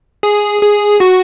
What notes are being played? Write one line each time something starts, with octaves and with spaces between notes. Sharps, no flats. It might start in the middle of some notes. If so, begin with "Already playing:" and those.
G#4
G#4
F#4